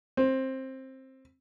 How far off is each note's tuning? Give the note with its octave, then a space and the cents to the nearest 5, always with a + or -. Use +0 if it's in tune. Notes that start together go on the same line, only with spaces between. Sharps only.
C4 +15